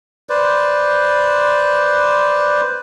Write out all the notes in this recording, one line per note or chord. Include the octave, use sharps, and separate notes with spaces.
B4 C5 D5